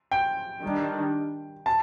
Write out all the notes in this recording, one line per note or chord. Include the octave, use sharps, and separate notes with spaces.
G5
D#3 G3 D4
A5